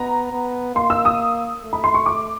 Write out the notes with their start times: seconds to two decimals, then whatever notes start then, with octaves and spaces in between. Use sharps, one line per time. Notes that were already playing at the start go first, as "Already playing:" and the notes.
Already playing: B3 A#5
0.32 B3
0.75 A#3 C6
0.90 E6
1.05 D#6
1.63 A3
1.73 B5
1.84 C6
1.94 C#6
2.06 D6